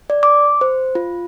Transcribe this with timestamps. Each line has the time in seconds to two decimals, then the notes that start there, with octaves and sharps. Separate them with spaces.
0.10 D5
0.23 D6
0.61 C5
0.95 F4